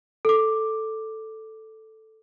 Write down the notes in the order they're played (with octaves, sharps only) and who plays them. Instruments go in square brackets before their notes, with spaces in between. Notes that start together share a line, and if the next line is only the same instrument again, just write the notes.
[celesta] A4 D6